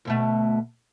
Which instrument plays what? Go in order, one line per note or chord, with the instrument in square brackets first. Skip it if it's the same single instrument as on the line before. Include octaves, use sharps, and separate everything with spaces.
[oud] D2 B2 A3